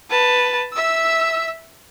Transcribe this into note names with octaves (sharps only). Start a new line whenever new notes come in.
B4 A5
E5 E6